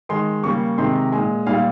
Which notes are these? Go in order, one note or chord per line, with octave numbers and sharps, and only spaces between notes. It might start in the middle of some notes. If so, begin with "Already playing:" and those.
D#3 G#3 C6
C#3 G3 A#3 C#6
C3 D#3 G#3 C6
A#5
A#2 G#3 G#5
A#2 G3 A#3 F5